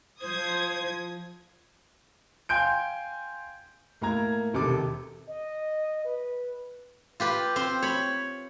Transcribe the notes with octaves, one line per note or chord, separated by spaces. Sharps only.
F3 C5 D#6 G#6
F5 G5 G#5 C6 G6 D7
A2 A#3 A#4 A#5 G#6
E1 D#2 C3 D#3 A4 D6
D#5
B4
F4 G4 B4
C4 C5
C#5 B5